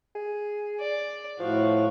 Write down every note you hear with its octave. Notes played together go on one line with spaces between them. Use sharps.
G#4
D5
A2 F3 F#4 F5